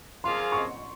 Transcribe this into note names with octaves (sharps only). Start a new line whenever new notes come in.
F3 A#3 F4 G#4 C5 C6
C#6